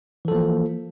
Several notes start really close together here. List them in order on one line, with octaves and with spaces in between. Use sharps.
E3 A4 F3 A#3